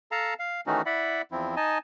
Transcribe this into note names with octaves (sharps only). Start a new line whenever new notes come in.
A4 F5 A5 A#5
F5
D#3 E3 A3 C#4 D#4 F#4
E4 D5 E5 F#5 B5
E2 F3 C4 E4
D#4 D#5 G#5 A5